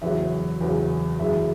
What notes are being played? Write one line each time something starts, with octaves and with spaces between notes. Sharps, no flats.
E2 C#3 F#3 E5
E2 C#3 F#3
F#2 C#3 E3 G#3 E5